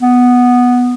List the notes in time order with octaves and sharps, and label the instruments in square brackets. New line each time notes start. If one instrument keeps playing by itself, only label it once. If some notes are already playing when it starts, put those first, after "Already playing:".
[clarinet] B3